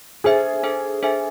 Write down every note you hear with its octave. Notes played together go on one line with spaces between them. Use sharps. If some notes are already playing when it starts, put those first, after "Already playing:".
D4 G#4 A4 C5 E5 G#5
D4 A4 C5 E5 G#5
D4 A4 C5 E5 G#5